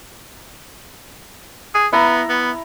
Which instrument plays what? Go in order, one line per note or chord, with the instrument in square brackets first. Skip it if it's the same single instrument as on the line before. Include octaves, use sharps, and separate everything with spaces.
[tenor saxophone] G#4
[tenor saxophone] B3 [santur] E4 A#5
[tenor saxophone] B3